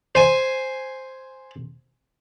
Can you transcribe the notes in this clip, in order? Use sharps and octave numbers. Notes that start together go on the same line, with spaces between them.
C5 G#5